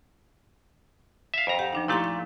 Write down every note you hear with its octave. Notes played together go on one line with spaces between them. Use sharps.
E5 F5
F2 A#5
G4 F#5
F3 D4 D#4
A#2 A3 E4 G4 C6
F5